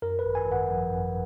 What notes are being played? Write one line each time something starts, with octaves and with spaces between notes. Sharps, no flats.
F#2 A#4
B4
G#1
G#5
G#1
F#5
F3
F#2